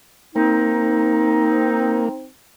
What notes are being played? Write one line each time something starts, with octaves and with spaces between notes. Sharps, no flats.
A#3 C4 D#4